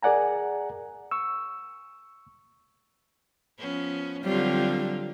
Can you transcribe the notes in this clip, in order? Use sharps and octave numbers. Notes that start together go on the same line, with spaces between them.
G#4 A#4 D5 F#5 G#5 A#5
C#6 E6
F3 B3 C#4
D3 F#3 G3 C4 F4